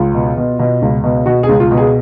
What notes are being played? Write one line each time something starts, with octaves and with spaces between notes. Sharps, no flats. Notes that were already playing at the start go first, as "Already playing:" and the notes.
Already playing: C#2 F4
B2
B2
B2
C#2
B2
B2 F#4
G#4
C#2
F4
B2
G#4